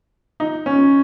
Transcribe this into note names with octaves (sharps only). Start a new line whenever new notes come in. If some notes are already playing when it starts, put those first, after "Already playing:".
D#4
C#4